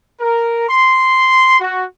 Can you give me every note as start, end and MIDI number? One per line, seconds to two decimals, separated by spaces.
0.21 0.66 70
0.68 1.58 84
1.60 1.84 66